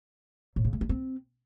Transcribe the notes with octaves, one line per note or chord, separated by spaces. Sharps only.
A2
C#3
A3
D4
C4